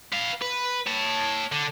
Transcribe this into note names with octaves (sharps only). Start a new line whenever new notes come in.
B4 F5
B4
C#5 A5
D3